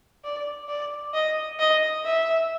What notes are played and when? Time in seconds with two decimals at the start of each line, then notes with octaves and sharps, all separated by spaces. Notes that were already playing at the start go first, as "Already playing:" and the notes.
0.24 D5
0.68 D5
1.14 D#5
1.59 D#5
2.05 E5